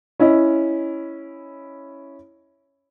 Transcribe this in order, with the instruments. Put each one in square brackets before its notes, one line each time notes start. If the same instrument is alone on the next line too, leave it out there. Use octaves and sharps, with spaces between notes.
[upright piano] C#4 E4 D#5